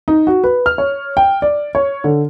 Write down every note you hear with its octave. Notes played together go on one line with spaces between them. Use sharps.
D#4
F#4
B4
F6
C#5
G5
D5
C#5
D3